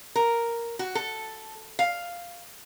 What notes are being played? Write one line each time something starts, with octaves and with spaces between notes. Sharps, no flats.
A#4
F#4
A4
F5